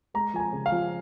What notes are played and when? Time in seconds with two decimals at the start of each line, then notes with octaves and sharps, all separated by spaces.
0.14 G#3 A#5
0.34 F3 G#5
0.40 A#5
0.53 C#3
0.66 F5
0.72 F3